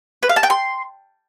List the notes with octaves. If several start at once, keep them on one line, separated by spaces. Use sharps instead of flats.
B4
F5
A5
G5
C6